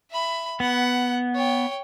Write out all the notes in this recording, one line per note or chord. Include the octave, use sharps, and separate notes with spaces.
E5 B5
B3 F#5
C#5 G5